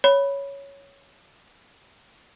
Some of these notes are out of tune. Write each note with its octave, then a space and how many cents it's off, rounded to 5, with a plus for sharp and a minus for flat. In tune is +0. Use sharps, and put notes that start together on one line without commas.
C#5 +5 B5 -5